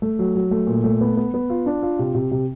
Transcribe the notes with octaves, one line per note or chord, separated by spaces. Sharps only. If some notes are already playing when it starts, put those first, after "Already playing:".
A3
F#3
F#3
A3
A#2
A3
B3
B3
B3
F4
D4
F4
C3
C3
C3